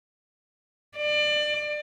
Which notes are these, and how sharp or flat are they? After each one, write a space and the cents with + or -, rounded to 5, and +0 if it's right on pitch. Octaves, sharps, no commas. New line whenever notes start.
D5 +25